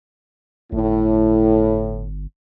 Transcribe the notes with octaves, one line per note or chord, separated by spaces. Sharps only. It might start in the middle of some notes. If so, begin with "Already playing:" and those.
G1 A2